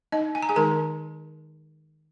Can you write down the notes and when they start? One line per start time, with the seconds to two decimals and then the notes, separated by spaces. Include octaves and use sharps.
0.12 D#4 D#5
0.35 G#5
0.42 A#5
0.49 G#4 G#5
0.56 D#3 G#3 D#4 A#4 A#5